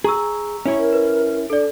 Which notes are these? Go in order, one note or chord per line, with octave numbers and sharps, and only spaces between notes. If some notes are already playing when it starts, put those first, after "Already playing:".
G#4 A#5 C#6 E6
C#4 E4 C#5
A#4
B4
D4 A4 D5